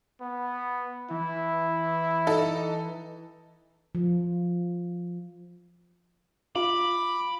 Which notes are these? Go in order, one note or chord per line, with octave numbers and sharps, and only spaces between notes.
B3
E3 E4
D#4 A4
F3
F4 B5 D6